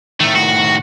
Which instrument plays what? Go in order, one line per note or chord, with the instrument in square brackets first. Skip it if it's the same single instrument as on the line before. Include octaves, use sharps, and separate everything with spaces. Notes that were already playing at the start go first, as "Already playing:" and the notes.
[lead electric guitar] A2 D#3 [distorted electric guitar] A3
[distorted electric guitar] F#4